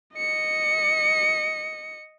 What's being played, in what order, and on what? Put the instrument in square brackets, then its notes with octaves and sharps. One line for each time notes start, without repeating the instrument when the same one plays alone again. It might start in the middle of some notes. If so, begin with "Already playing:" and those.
[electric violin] D#5 C#7